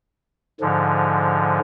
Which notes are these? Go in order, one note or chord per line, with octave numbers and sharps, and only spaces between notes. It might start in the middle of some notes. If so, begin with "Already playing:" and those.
G#2 D3 F3